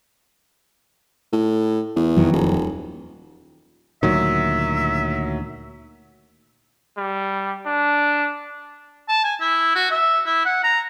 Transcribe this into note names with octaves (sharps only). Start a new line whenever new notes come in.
A2
E2
F2 D#3 F#3
D#1
D2 A#2 D#3 F#3 E5
G3
D4
A5
G#5
E4
F#4
E5
E4
F#5
A#5